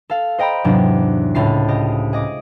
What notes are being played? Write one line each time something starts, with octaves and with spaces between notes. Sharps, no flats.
A4 F5
C5 D#5 G5 A#5 B5
E2 G#2 C3 F#3 D4
C#2 A2 F4 A5 C7
F4 G4 D#5
G#4 D#5 D6